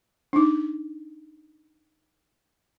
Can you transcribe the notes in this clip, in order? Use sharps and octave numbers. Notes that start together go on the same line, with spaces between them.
D4 D#4